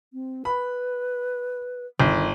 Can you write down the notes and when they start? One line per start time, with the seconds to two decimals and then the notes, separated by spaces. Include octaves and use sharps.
0.13 C4
0.45 B4 B5
2.00 G1 D#3